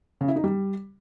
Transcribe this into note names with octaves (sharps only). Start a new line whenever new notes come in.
C#3
E4
D#4
G3